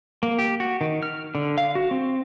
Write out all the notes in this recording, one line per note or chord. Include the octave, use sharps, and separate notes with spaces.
A#3
G4
F#4
D#3
F6
D3
F5
F#4
C4